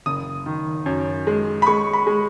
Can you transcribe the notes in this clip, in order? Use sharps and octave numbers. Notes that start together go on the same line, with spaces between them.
F#1 D#6
D#3
F#2
G#3
B5
G#3 C#6
B5
G#3